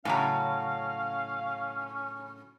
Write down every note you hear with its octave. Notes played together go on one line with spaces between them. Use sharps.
A2 C#3 F#3 C#4 F5 G#5 A#5